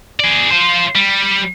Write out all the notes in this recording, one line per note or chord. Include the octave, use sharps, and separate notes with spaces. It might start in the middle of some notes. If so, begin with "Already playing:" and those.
G#4 D5
F4 C5
G3